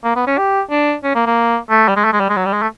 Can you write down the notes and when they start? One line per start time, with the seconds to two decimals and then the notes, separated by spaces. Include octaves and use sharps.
0.04 A#3
0.16 B3
0.27 C#4
0.38 G4
0.71 D4
1.04 C#4
1.15 A#3
1.26 A#3
1.70 A3
1.88 G3
1.96 G#3
2.05 A3
2.13 G#3
2.20 G3
2.29 G#3
2.37 F#3
2.45 G3
2.53 G#3
2.62 A3